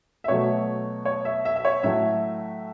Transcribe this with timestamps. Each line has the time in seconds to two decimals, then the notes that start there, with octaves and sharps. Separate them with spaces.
0.24 E5
0.28 B2 F#3 A3 C#5
1.05 C#5
1.25 E5
1.45 E5
1.56 E5
1.65 C#5
1.83 A2 F#3 A3 E5